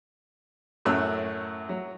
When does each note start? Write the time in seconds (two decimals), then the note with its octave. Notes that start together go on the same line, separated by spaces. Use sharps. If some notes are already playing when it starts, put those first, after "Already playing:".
0.85 F#2 A2 F#3 E6 F#6
1.69 F#3